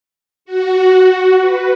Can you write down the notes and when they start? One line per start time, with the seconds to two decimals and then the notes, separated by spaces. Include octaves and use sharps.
0.45 F#4
1.41 B4